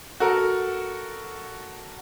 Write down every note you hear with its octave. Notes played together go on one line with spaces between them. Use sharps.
F#4 A4 A#4